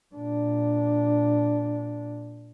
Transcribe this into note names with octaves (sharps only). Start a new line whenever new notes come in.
A#2 D4